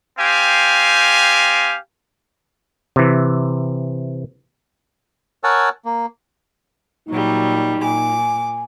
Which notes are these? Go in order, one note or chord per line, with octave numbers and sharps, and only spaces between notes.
C4 G4 F5 G#5
C3 E3
A#4 C#5 F#5 G#5 A5 E6
A#3
A#2 F#3 G3 D#4
A#2 G#5 D6